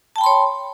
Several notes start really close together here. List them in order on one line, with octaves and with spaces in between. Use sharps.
A5 G5 B5 C6 C#5